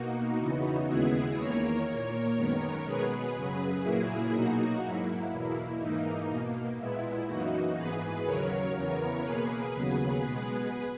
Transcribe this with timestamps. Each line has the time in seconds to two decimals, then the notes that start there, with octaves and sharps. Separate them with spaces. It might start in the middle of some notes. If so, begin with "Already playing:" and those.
Already playing: B2 A#3 D#4 F#4
0.39 E2 C#3 E3 B3
0.88 D#2 C#3 G#3 B3 E4 G#4
1.38 E2 D#3 A#3 A#4 C#5
1.86 A#2 A#3 A#4 C#5
2.37 F#2 D#3 G#3 B3
2.85 B2 G#3 B3 G#4 B4
3.35 F#2 C#3 F#3
3.83 A#2 F#3 A#3 E4 G#4
4.33 B2 F#3 A#3 D#4 F#4
4.82 G#2 F#3 A#3 E4
5.32 E2 B2 A#3
5.80 G#2 E3 A#3 D#4
6.29 B2 A#3
6.78 A#2 G#3 B3 E4
7.27 F#2 E3 A#3 D#4 F#4
7.77 G#2 E3 B3 G#4 B4
8.26 D#2 C#3 F#3 A#4 C#5
8.75 E2 C#3 E3 B3 A#4 C#5
9.24 B2 A#3 G#4 B4
9.74 D#2 C#3 F#3 B3
10.23 B2 G#3 B3